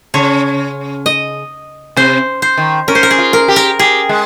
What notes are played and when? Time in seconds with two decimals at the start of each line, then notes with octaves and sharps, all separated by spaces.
0.14 C#3 C#5
1.06 D#5
1.97 C3 C5
2.42 C5
2.58 D#3
2.88 C#4 A#4
2.95 C5
3.03 A#4
3.11 G#4
3.18 F4
3.33 A#4
3.48 G4
3.56 A#4
3.79 G4 G#4
4.09 G#3